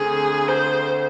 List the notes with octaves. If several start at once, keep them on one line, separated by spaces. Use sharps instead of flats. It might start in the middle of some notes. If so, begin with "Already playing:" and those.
Already playing: D2 D3 A3 C4 G#4
C5